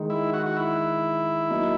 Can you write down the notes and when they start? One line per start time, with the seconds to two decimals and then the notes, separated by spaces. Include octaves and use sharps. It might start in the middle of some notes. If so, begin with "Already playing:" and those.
Already playing: D#3 G#3 D#4
0.10 E4
0.33 F#4
0.46 F#4
0.57 E4
1.50 F#3 A#3 D#4